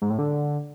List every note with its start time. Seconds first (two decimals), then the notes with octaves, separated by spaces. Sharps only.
0.02 G#2
0.10 A2
0.19 D3